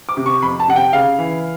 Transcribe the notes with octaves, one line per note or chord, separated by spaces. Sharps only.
D6
C3
C#6
F2 B5
A5
C3 F#5
G5
C#3 F5
E3